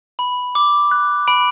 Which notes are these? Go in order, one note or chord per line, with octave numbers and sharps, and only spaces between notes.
B5
D6
F#6
B5 D7